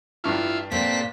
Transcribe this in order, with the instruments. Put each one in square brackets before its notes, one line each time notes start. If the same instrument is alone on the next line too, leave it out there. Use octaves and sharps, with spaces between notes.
[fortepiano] A1 G2 F6 [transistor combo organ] E4 F4
[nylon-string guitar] A#2 [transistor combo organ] C4 A4 [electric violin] B6